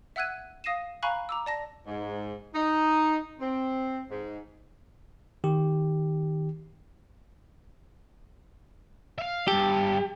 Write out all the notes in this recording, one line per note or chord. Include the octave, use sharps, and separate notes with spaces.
E5 F#5 E6 F#6 G#6 D#7
F5 D#6 A#6 C7 D#7 E7
F5 G#5 A#5 B5 C#6 F#6
A#5 D6 E6
D5 A5 A#6
G#2
D#4
C4
G#2
D#3 G4
E5 F5
G2 G4 A4